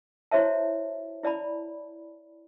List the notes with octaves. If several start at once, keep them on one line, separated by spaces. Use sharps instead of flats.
E4 F#4 C5 C#5 E5 A5
E4 D5 A5 B5